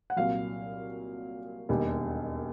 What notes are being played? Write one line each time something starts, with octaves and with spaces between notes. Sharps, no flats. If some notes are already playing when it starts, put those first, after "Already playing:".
F#5
C2 A#2 F#3 F5
E1 D#2 D#3 G3